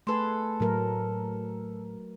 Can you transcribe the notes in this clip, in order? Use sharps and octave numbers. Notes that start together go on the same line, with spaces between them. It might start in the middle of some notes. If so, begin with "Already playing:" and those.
A3 G#4 A4 B4 C6
A2 F#3 A3 A#4